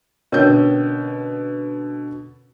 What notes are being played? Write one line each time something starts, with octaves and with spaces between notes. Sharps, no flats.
B2 D3 C#4 A#4 C#5 G6